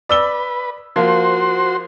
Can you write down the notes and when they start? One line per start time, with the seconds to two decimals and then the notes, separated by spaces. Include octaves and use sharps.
0.09 B4 D5 E6 G7
0.96 F3 A#3 F4 F#4 C5 C6